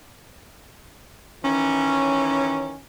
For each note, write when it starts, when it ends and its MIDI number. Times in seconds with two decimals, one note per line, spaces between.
1.44 2.77 51
1.44 2.77 52
1.44 2.77 61